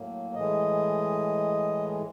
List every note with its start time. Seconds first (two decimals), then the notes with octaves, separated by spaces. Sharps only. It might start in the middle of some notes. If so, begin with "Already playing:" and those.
Already playing: A2 F#3 A#3
0.35 A2 E3 G#3 D#5